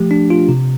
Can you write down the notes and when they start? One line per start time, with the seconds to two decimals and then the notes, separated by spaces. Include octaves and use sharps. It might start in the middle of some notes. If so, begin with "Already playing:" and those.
Already playing: F3 A3 G4
0.11 D4
0.30 F4
0.49 C3